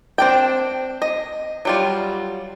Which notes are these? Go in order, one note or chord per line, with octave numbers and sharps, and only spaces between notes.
C4 D4 G5
D#5
F#3 G3 F4